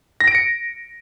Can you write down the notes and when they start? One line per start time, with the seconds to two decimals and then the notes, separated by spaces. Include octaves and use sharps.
0.20 A#6
0.28 D7
0.35 C#7